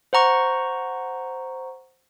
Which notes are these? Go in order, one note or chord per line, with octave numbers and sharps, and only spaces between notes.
C5 F#5 A#5 C#6